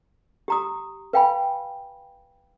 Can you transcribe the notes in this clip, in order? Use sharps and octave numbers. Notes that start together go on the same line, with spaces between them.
G4 A#5 D#6
B4 F5 G5 G#5 B5